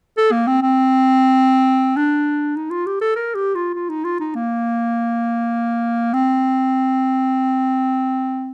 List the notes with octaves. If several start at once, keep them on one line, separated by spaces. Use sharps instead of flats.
A4
A#3
C4
C4
D4
D#4
F4
G4
A4
A#4
G4
F4
F4
D#4
F4
D#4
A#3
C4